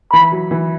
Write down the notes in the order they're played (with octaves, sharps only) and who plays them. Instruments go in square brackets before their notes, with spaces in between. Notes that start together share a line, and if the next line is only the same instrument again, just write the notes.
[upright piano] E3 [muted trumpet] B5
[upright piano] F#3
E3